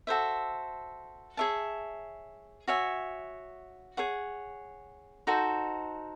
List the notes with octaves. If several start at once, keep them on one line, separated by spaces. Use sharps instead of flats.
F#4 A4 C5 E5
G#4 C#5 E5 A5
F#4 C#5 E5 G#5
G#4 C#5 F#5
D#4 F#4 A4 C5